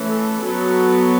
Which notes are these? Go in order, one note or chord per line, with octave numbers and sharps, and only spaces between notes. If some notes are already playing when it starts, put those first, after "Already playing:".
Already playing: E3 A3 C#4
A4
F#3 B3 A4